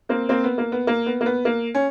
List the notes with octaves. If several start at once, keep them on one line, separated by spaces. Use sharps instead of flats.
A#3 C4
A#3 C4
B3
A#3
B3
A#3
B3
A#3
B3
A#3
C#4